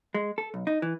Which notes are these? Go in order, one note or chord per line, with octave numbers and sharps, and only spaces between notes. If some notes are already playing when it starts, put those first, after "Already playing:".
G#3
A4
B1
D#4
E3